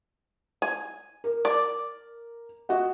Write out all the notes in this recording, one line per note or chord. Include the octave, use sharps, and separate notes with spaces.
G#5
A#4
D5
F#4 D#5 F#5